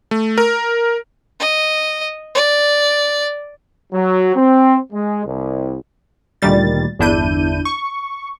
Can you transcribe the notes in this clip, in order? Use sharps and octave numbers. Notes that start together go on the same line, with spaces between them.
A3
A#4
D#5
D5
F#3
C4
G#3
C2
D2 A#2 D#3 G3 A6
G1 E2 D4 E4 G6 D#7
C#6